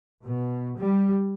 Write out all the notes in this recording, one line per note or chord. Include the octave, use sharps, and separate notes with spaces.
B2
G3